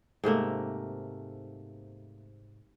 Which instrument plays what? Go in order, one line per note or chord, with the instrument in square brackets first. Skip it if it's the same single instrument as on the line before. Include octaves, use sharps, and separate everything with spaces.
[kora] G#2 C3 A3 A#3